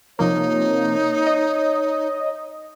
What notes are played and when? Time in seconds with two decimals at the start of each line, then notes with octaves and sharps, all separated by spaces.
0.19 C3 F3 A#3 D#4 C#5
1.27 D#5